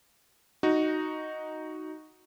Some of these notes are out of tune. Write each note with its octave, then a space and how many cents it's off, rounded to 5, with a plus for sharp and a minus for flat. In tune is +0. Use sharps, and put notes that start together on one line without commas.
D#4 +0 F#4 +0